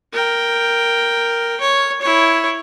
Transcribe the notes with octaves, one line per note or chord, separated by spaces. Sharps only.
A#4 G5
C#5
E4 C#5